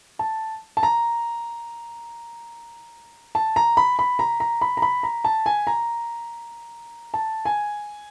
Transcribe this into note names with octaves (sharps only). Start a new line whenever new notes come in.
A5
A5
A#5
A5
A#5
B5
B5
A#5
A#5
B5
A#5
B5
A#5
A5
G#5
A#5
A5
G#5